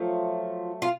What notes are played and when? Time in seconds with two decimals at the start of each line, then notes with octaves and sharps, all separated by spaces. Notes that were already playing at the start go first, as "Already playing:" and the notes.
Already playing: F3 F#3 A3 F4
0.82 F4